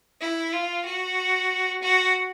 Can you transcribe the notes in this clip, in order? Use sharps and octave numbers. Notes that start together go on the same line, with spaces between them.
E4
F4
F#4
F#4